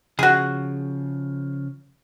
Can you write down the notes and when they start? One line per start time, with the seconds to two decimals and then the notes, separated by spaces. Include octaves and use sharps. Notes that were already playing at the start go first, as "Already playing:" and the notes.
0.19 C#3 F3 F#4 G#4